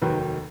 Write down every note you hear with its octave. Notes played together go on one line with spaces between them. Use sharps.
F1 D#2 D#3 F#3 B4